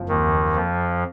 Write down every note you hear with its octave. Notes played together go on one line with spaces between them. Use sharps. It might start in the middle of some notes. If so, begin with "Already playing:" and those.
Already playing: F#1 F2 F3
D#2 D#3
F2 F3